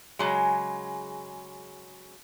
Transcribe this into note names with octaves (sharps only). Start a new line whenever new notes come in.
C#3 F#3 G#3